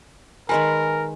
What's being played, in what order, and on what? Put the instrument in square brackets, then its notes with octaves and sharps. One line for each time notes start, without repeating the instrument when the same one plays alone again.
[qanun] D#3 G#3 B4 [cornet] A#4 [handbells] G#5